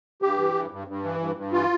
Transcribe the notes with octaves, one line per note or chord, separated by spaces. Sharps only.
G2 G4
E3
G2
G2
G2
E3
G2
G2
E3 F4